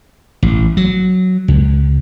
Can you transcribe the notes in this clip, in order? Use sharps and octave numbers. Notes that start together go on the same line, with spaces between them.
A1
F#3
C#2